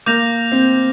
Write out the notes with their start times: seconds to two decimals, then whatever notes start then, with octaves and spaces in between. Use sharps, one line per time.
0.06 A#3 D6 G6 A#6 F7
0.52 C4